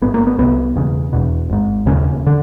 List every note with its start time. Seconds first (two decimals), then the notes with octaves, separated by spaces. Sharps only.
0.02 G#1 G#2 B3
0.14 A#3
0.27 B3
0.38 C2 C3 B3
0.75 E1 E2 C#3
1.13 E1 E2 B2
1.50 G#1 G#2
1.86 E1 D#2 C#3 C#4
2.27 D3